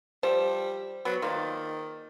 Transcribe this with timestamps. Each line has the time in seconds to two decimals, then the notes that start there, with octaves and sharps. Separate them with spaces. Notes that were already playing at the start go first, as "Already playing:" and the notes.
0.23 F3 G3 C5
1.05 F#3 B3
1.22 D#3 A#3 F4 D5